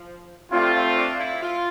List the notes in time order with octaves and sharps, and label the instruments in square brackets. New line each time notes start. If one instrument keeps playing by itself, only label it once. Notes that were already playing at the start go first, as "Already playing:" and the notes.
Already playing: [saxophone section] F3
[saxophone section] G3 [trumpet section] A3 C4 F4
[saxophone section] F3
D4
E4
F4